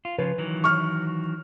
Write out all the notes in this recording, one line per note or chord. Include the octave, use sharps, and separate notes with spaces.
F4
C#3 F3 B4
D#3 E3 F#3
C#6 F6